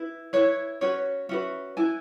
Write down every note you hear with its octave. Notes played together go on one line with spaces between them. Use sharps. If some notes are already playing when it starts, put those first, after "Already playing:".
Already playing: E4 B4
E4 B4 C#5
C#4 F#4 B4 C#5
C#4 F#4 B4 E5
E4 B4 G#5